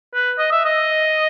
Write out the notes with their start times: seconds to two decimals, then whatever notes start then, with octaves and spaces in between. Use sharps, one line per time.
0.14 B4
0.38 D#5
0.52 E5
0.65 D#5